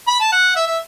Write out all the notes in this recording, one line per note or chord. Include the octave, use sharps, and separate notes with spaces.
B5
A5
F#5
E5
E5